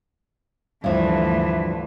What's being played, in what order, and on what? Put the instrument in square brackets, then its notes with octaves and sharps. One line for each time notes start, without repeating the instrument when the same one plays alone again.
[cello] D2 E3 [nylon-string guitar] G2 F3